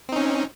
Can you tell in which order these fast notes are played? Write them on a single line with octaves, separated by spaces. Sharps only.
C4 D#4 C#4